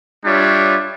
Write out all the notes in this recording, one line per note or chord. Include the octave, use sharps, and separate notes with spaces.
G3 D4 F4 C#5 E5